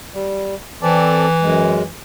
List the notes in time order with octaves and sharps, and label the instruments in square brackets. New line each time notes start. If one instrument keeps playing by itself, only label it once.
[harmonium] G3
[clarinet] E3 [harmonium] C4 A4 D5
[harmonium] F#2 G#3